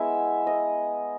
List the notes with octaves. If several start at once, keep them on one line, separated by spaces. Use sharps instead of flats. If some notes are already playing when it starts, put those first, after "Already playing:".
Already playing: G#3 B3 E4 E5
D#5